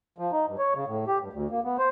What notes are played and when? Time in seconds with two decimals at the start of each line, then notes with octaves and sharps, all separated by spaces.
0.18 F3
0.32 D#4
0.47 G2
0.58 C#5
0.75 C#3
0.88 A2
1.07 G4
1.20 G2
1.33 D2
1.51 A#3
1.64 B3
1.78 C5